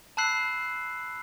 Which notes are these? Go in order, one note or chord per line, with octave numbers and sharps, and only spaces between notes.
A5 B5 E6 F#6 C7 F#7